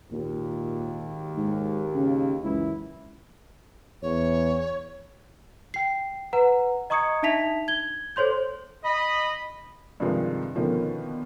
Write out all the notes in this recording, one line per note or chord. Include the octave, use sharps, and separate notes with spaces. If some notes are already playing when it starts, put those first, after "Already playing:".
G#1 D#2 A#2
G#2
C#3
C#2 F#2 E3 E4
E2 C#5
G5 C7
B4 F#5 A#5
D#5 A#5 C#6 D#6 G#6 C#7
D4 D#4 E5 A5 B6 F7
G#6 G7
A4 C5 C#5 C6 G6
D#5 B5
G2 C3 D#3 F3 G#3
B2 D3 D#3 F3 A#3 C#4